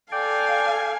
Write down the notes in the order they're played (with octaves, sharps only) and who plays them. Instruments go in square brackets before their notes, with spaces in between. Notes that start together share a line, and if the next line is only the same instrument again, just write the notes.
[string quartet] A4 F5 G#5 [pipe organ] D5 G5